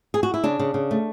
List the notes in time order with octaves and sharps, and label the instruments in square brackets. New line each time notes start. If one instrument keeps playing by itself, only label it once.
[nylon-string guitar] G#4
F#4
E4
C#3 D4
C#3
C#3
A3